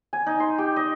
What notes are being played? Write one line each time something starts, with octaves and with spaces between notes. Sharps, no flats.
G#5
D#4
C6
G4
D#5